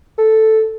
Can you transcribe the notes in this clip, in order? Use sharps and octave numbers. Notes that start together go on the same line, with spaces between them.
A4